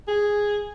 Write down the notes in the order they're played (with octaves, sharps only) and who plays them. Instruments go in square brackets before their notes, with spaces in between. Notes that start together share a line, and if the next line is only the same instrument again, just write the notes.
[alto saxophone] G#4